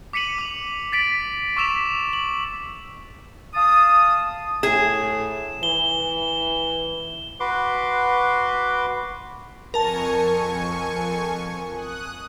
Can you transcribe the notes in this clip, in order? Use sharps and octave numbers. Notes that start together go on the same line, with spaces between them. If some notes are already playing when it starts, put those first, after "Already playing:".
D6 B6 C#7 D#7 F#7
D6 F7
A6 B6 D7 F#7
C#6 D6 E6 B6 E7 F7
F#7
F5 A5 D#6
A2 G#4 E7
E3 G7
F#4 B4 C6 D6
F2 A#4 G#5 A5 C#6
D#6 F#6